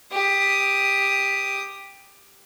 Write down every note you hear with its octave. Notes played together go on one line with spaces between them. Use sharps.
G4 D#6